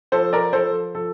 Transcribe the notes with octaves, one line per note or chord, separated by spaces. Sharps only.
F3 A4 C5
A#4 D5
F3 A4 C5
F3 A4